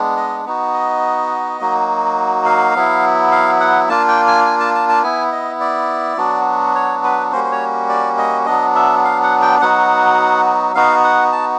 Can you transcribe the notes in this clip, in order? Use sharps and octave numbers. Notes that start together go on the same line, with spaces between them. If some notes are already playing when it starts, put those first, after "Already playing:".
Already playing: G#3 B3 D4
D#5
B3 D#4 F#4
D#5
F#3 A#3 D#4 F#4
F5
F#3 B3 E4
F5
F#5
A#3 D4 F4 A5
G5
G#5
G#5
A5
A5
A5
B3 E4 G#5
D#5
D5
F#3 B3 D4 F#4
C#5
B4
G3 A#3 C#4 F#4 C5
C5
C#5
D5
D#5
F#3 B3 D4 D#5
E5
F5
F#5
G5
F#3 B3 D#4 F#4 F#5
B3 D#4 F#4 F5
F#5
A5